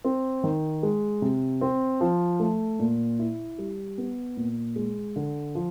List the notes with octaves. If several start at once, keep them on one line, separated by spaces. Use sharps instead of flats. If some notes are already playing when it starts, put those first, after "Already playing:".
C4
D#3
G#3
C3
C4
F3
A3
A#2
E4
G3
B3
A#2
G#3
D3
F3